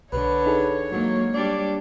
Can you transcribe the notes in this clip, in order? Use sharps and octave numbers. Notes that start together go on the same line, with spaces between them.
B1 D3 B4 C#5
D#4 G#4 A4
G#2 F#3 A#3
G3 D4 D5